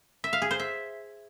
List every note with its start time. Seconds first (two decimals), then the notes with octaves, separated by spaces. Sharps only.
0.24 E5
0.33 F5
0.42 G#4
0.51 C5
0.59 E5